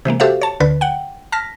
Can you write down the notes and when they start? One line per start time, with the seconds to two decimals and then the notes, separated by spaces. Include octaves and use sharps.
0.05 C3 E3 G#3 A#3
0.20 F#4 G4 A4 C5 E5 F5
0.41 C#5 A5
0.60 D2 D3 B4
0.81 F#5 G5
1.32 A5 F6 A#6 B6